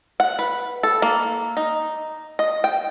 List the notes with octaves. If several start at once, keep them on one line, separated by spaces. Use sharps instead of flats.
F#5
B4
A4
A#3
D#4
D#5
G5